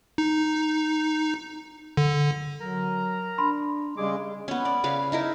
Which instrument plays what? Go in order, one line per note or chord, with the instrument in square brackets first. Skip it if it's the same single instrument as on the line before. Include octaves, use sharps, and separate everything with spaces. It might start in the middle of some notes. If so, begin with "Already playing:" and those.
[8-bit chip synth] D#4
D3
[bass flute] F#3 [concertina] A#4 A#5
[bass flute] D4 [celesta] B5 C6
[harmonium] C#3 G#3 [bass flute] G3 [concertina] G#4 D6
[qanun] B3 C#4
D5
C#3 B4 F5
D#4 E4 A#4